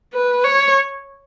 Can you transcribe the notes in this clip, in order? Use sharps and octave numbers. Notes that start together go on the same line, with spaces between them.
B4
C#5